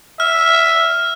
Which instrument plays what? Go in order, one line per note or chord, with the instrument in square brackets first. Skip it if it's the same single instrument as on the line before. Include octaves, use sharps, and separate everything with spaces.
[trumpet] E5 [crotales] F6